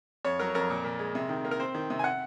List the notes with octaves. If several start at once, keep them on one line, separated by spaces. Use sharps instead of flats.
F2 C#5
F#3 A#4
F2 A#4
A#2
A#2
G#3
C3
D#3
A#3
A#4
C4 C5
D#3
C3
G#5
F#5